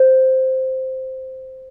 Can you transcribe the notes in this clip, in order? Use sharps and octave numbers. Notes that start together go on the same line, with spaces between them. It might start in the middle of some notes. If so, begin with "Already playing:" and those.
Already playing: C5